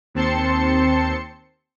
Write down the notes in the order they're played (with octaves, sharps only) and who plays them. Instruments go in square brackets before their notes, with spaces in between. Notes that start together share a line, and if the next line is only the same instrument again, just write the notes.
[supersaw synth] D#2 C4 A5 C6 C#7